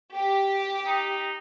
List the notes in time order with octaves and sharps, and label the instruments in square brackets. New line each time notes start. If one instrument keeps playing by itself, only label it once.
[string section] G4
[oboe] D#4